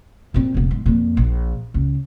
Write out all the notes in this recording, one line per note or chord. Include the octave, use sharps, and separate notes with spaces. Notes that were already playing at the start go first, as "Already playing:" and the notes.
A#2 C4
F1 B3
G#2
F2 A#2
A#1
C#2